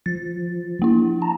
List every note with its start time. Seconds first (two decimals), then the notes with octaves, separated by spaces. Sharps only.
0.06 F3 A6
0.82 A#3 E4
1.22 A5 A#5